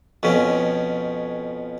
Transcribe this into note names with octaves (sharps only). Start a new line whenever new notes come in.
F2 B2 C#4